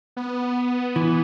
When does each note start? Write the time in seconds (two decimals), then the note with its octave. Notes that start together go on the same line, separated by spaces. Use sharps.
0.17 B3
0.96 E3